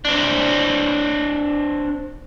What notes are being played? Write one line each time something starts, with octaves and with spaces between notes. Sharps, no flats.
C4 D4